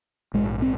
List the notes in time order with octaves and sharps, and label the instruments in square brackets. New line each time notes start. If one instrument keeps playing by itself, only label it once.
[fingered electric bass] A#1 G#2 G#3
C4